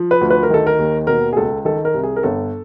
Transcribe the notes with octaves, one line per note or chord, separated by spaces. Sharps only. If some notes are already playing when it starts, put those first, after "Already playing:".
Already playing: F3
B4
D2
B4
A#4
D#3 A4
A#4
D#2
B2 A#4
G#4
C#2 A4
D#3 A4
A#4
C2
G#4
A#4
G1 A4